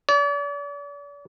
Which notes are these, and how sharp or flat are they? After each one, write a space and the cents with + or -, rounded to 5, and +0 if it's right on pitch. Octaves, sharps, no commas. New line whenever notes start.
D5 -40